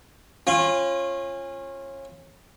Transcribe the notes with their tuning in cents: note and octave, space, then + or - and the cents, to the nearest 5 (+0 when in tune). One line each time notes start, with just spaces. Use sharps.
C#4 -30 F4 -10